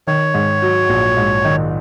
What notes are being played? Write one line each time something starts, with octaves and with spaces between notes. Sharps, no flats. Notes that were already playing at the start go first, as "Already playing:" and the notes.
D#3 C#5
G#2
F#3
A#1
G#2
D#3